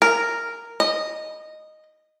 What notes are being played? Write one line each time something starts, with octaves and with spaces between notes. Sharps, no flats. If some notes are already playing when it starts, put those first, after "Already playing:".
A#4
D#5